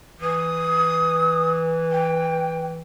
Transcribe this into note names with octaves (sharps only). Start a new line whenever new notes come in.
E3 D#6
G5